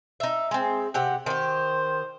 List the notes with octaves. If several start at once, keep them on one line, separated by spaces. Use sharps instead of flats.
D#4 E5
G#3 C4
C3 G4 F#5
D#3 G4 C5